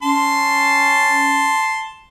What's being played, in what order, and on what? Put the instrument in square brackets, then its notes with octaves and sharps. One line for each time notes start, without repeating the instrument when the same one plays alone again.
[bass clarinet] C#4 [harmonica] A5 C6